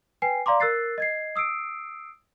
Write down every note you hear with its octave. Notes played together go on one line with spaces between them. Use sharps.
B4 G5 G#5 C7
D5 F5 A#5 C6 D6
A#4 E6 F#6 A6 C7
D#5 G#6 C7
D#6 E6 C7 D7